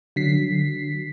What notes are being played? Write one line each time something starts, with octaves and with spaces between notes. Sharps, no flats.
D3 F#3 B6 C7